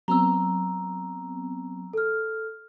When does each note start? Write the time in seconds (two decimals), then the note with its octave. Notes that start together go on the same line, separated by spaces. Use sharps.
0.08 F#3 B3 C4 A#5 E6
1.93 A4 F6